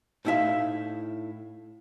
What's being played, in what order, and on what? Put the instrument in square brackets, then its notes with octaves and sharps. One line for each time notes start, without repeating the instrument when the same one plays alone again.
[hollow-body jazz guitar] A2 D#4 E4 G#4 E5 F5